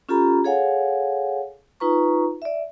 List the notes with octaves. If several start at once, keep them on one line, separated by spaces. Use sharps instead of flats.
C#4 F4 G4 A4 A#5 B5
G#4 A4 C#5 F5 F#5 G#5
D#4 F4 B4 A#5 C#6
D5 E5